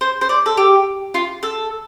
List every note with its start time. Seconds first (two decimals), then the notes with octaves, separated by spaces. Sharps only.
0.01 C5
0.21 C5
0.29 D5
0.46 A4
0.57 G4
1.14 F4
1.43 A4